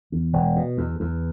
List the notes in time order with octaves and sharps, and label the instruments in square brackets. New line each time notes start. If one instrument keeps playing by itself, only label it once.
[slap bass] E2
E1
B2
E2
E2